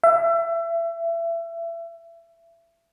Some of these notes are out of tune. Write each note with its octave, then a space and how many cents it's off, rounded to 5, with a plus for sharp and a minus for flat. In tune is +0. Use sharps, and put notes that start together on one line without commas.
E5 +30